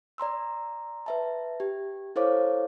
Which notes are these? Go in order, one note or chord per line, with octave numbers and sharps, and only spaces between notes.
D5 A#5 C6 E6
B4 E5 A5
G4
E4 A4 C5 C#5 F5 D6